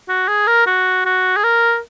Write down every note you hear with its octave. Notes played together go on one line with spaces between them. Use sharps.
F#4
G#4
A#4
F#4
F#4
G#4
A#4